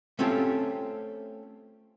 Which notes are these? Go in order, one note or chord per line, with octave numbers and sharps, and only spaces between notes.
A3 C4 C#4 F4 G4 A4